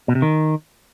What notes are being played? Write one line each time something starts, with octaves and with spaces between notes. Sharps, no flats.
B2
C3
D#3